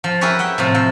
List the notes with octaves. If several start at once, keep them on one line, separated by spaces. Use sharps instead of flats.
F3
E4 G4 G#4 A#4 B4 C#5
E5 F#5 G5
A2 C3 F3
F3